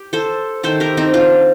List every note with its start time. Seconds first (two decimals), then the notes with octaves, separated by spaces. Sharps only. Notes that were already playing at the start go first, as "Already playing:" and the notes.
Already playing: G4
0.13 A4 C5
0.63 D#3 A3 A4 C5
0.80 G4 A#4
0.97 C4 D#4
1.14 D4 F4